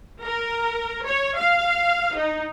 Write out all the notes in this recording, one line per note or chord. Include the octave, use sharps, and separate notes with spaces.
A#4
C#5
F5
D#4